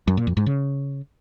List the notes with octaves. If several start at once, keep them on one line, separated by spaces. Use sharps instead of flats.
F#2
A#2
F2
G#2
C#3